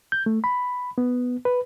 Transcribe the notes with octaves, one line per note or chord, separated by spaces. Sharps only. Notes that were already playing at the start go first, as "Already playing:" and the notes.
G6
A3
B5
B3
B4